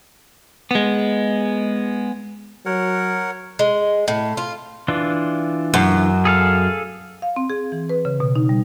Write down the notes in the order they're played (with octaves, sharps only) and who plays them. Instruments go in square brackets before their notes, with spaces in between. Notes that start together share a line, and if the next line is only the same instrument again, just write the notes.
[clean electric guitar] G#3 B3
[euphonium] F#3 [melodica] A#4 C#5 F#5
[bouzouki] G#3
A2
F4
[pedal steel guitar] E3 D4 F4
[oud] F#2
[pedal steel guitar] G#4 A4 F5
[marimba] F5
C4
G#4
E3
B4
C#3
B2
D#4
G3